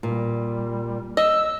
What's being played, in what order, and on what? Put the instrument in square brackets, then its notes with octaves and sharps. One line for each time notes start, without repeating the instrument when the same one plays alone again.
[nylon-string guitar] A#2 [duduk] G3
[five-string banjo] D#5 [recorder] E6